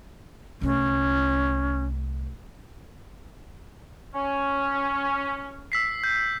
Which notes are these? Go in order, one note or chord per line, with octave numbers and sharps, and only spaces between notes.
C2 A3 C#4
C#4
E6 B6 C7
G6